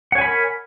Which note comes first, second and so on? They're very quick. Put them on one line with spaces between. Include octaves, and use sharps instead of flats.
F#5 C#5 G#5 B5 A#4